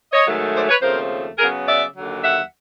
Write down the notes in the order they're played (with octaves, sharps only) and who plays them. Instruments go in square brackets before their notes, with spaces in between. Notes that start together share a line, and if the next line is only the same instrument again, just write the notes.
[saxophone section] C#5 D#5
G#2 D#3 F#3 A3
C5 D5
B4 C#5
D#2 C#3 F3 A3 C4 A#4 C5
C#3 F#3 B3 G#4 A#4
D5 E5
D#2 D3 F#3
E5 F#5